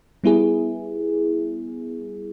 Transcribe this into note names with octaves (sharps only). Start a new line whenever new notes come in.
G3 B3 E4 G#4